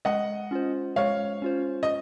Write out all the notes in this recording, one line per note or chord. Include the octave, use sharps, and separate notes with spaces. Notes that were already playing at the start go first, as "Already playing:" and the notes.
G#3 D#5 F#5
C#4 F4 C5
G#3 C#5 F5
C#4 F4 C5
D#5